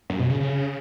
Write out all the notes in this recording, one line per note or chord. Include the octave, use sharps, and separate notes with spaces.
F#2
B2
C#3
C#3